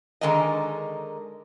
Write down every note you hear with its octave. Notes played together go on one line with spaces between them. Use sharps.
D3 D#3 G#3 D#4 A#4 D#5